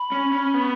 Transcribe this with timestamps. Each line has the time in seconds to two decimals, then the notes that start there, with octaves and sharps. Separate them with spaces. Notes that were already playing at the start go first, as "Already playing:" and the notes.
Already playing: B5
0.12 C#4
0.32 C#4
0.54 B3